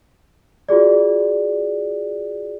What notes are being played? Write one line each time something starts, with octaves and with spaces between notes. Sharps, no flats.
F4 F#4 G#4 D5